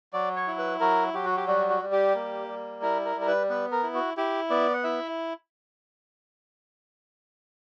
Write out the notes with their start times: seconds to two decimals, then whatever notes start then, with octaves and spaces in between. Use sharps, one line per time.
0.13 F#3 D5
0.36 C#5
0.47 E4
0.58 B4
0.80 F#3 A#4
1.14 F#3 G4
1.25 F#4
1.37 G4
1.47 G3 F#4
1.70 F#4
1.82 G3
1.92 G4
2.15 A#3
2.48 G3
2.82 E4 A#4
3.05 A#4
3.16 G3
3.21 A#4
3.27 B4
3.49 B3 B4
3.72 A#4
3.83 E4
3.94 F#4
4.17 E4 G4
4.50 B3 D5
4.74 F#5
4.84 E4 E5